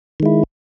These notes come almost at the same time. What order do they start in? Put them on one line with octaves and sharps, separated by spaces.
D#3 G#3 E4